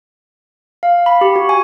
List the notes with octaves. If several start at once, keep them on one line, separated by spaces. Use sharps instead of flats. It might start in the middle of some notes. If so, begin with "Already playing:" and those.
F5
B5
G4
F#4
G#5